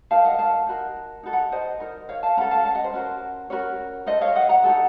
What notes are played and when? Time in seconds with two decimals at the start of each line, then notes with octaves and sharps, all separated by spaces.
0.11 D#4 A#4 F5 A5
0.25 D#5 F#5
0.39 F5 A5
0.67 D#4 F#4 A#4
1.23 D#4 F#4 A4
1.33 F#5 A#5
1.52 C5 D#5
1.80 D#4 A#4
2.09 C#5 F5
2.23 F5 A5
2.37 C#4 A4 F#5 A#5
2.51 F5 A5
2.65 F5 A5
2.75 D#5 F#5
2.84 C5
2.94 C#4 F#4 A#4
3.50 C#4 F#4 A#4 C#5
4.07 D#4 A4 C5 D#5
4.21 C#5 F5
4.35 D#5 F#5
4.49 F#5 A#5
4.64 F#4 A4
4.69 D#4